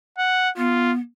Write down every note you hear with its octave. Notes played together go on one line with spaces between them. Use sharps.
F#5
B3 F4